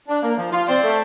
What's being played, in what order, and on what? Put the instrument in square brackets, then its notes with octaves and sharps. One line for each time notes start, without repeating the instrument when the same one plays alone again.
[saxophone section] D4
A#3
F3
F4
[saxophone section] C4 [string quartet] C5 D5
[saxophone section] A3